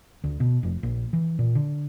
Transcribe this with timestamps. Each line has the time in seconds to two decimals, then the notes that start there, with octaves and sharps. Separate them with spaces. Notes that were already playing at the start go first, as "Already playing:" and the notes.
0.24 D2
0.40 B2
0.63 F1
0.83 A#1
1.13 E3
1.39 A#2
1.55 D3